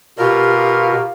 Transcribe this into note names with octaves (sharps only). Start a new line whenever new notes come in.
B2 F4 G4 A#4